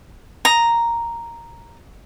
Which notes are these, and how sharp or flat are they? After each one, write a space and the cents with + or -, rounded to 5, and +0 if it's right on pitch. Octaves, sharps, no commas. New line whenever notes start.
A#5 +0 D#6 +0